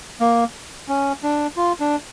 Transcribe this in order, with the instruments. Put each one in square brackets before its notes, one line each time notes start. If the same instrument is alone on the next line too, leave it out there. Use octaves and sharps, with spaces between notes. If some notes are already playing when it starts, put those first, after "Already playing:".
[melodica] A#3
C#4
D4
F4
D4